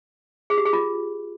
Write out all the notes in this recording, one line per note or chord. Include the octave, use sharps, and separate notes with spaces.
G#4
G4
G#4
F4